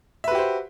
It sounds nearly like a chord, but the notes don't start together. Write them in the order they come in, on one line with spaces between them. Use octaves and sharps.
E5 B4 F#4 G4 C5